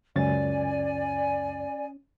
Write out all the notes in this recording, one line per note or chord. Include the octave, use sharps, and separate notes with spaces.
C#2 F#2 C#4 D5 G#5 A6